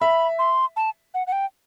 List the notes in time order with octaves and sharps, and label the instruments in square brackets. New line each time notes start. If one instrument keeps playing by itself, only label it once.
[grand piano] E5 [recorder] B5
[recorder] C6
A5
F#5
F#5
G5